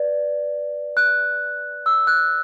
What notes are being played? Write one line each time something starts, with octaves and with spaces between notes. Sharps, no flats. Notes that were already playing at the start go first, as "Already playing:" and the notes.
Already playing: B4 D5
F#6
E6
F#6